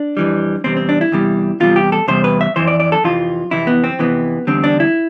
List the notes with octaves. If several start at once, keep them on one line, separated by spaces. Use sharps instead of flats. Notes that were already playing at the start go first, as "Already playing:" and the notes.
Already playing: D4
F2 E3 G3
E2 C3 G3 C4
C4
D4
E4
E2 C3 G3
E2 C3 G3 F4
G4
A4
E2 C3 G3 C5
B4
E5
F2 C3 E3 C5
D5
D5
A4
F2 C3 E3 F4
F2 C3 E3 E4
B3
C4
F2 C3 E3 B3
E2 D3 G3 C4
D4
E4